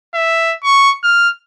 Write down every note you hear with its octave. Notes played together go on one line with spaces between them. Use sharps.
E5
C#6
F6